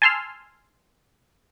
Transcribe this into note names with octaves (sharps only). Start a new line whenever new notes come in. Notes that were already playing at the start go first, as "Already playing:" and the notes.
G#5 A5 C6 E6 F6